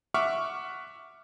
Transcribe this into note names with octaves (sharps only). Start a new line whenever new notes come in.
E5 F#5 C#6 D6 F6